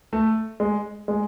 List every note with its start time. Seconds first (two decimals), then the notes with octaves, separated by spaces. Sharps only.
0.13 A3
0.60 G#3
1.08 G#3